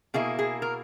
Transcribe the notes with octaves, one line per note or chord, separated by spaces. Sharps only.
B2 A#3 E4 G#4
G#4
A#4